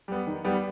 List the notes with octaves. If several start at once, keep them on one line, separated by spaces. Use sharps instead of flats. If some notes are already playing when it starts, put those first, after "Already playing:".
G3 B3
D#3
G3 B3